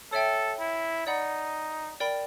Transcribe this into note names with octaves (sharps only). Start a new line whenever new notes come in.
A4 C#5 E5 G5
E4
D#4 D5 F#5 B5
A#4 D5 G5 B5